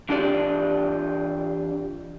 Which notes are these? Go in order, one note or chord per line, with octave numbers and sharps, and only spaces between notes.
E3 D4 F4 G4 D5